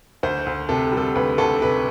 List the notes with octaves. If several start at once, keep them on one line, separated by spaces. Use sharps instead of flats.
D2 C5
D2
C3 A4
G3
A4
D2 B4
D2 A4
C3 B4